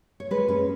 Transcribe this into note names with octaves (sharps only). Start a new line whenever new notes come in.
C#5
G#3 B4
C#4 B4